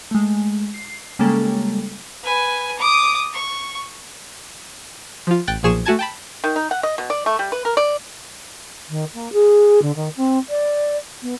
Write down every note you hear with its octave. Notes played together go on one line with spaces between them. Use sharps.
G#3 A3
C7
C#3 G3 G#3 A#3 C#4 A4
B4 G#5
D6 D#6
C#6
F3 F4
A1 G5 F#6 A6
B1 A#2 F3 G#4 C#6 E7
A3 F#4 G#5 A5 G#6
G5 A5 B5
D#3
D#4
F#5
D#5
B2
D5
A3
G3
B4
A#4
D5
D#3
A#3
G#4
D3
D#3
C4
D5
B3